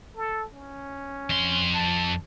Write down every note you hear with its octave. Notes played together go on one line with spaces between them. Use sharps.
A4
C#4
F2 C6
A5